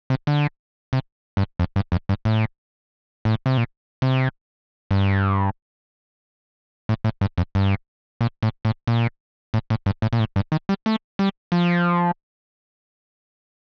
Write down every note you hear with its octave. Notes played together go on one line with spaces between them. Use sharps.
C3
D3
C3
G2
F2
G2
F2
G2
A2
A2
C3
A#2
C3
G2
A2
A2
G2
F2
G2
A#2
A2
A2
A#2
A2
A2
G2
A2
A#2
A2
G2
D#3
G3
A3
G3
F3